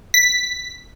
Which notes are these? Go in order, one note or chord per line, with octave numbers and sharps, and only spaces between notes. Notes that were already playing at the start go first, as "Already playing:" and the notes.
B6